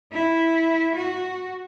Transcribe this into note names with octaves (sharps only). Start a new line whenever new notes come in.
E4
F#4